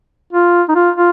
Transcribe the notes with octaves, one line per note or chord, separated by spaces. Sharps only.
F4
D#4
F4
F4